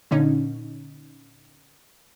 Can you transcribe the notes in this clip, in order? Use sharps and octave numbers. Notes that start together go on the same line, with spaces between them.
A#2 D3 C#4 D#4